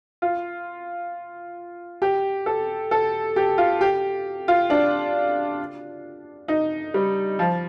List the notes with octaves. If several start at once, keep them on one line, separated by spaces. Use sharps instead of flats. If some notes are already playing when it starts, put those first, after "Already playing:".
F4
G4
A4
A4
G4
F4
G4
F4
D4
D#4
G3
F3